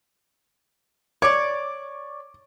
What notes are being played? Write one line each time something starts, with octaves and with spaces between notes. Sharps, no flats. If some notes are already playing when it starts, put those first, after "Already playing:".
C#5 D5 D6